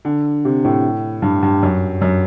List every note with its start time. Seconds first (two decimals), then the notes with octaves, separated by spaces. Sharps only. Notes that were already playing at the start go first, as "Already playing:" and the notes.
0.05 D3
0.45 C3
0.64 A2
1.22 G2
1.43 G2
1.63 F#2
2.01 F#2